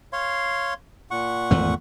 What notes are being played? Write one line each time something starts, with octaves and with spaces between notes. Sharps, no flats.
C#5 F5 C6
A#2 F#5 C#6
G#1 E2 A3